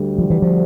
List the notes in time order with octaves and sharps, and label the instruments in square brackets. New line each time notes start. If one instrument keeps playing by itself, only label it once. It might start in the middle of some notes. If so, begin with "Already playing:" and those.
Already playing: [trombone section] D2 D3 G3
[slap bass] F3
E3
F3